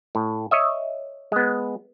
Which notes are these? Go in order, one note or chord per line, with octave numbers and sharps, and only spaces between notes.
A2
C#5 D#5 E5
G#3 B3